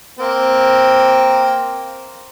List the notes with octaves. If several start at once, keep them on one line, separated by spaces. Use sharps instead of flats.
A#3 C4